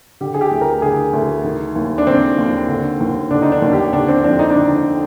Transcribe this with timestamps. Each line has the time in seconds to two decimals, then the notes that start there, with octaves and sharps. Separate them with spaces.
0.21 D3 G4
0.34 G#4
0.41 G4
0.51 D2
0.61 A#4
0.82 D3 G#4
1.13 D2
1.44 D#3
1.76 D#2
1.98 D4
2.07 D#3 C4
2.38 D#2
2.68 D3
3.00 D#2
3.31 D3 D4
3.42 D#4
3.52 D4
3.62 D#2
3.73 G4
3.93 D3 D4
4.08 C4
4.18 C4
4.24 F2 D4
4.39 D#4
4.50 D4
4.55 D3 D#4